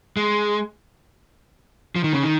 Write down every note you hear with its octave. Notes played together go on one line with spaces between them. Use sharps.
G#3
F3
D#3
C#3
D#3